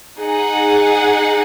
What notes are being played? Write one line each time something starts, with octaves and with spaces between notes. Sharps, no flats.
D#4 G#4 F#5